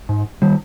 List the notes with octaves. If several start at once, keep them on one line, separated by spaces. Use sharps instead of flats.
G#2
D#3 G3